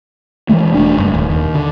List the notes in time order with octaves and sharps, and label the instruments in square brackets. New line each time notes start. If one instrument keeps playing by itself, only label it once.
[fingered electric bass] E3 F3 G#3 A3
E1 A3 D4
F#1 G2
D#1 D#2
D#2
D3